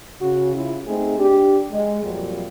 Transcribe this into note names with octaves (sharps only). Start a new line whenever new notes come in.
C#3 F#4
C#3 E4 F4
A3 C4 D#4 G#4
D4 G4
G#3
F2 A#2 F#3 G3